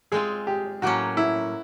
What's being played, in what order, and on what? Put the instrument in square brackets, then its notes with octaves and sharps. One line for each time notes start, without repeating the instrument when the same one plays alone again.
[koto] G#3 C4 F4 [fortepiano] G#4
[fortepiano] G4
[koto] A2 F#3 A#3 C#4 [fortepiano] F#4
[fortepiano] E4